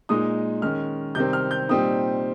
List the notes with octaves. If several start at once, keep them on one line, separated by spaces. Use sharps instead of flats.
A#2 G#3 D#4 D#6
D#3 G#3 C#4 F6
C3 D#3 G3 C4 G6
F6
G6
A#2 G3 C4 D#4 D#6